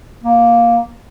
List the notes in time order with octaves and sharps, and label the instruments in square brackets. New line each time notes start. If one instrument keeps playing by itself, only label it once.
[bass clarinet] A#3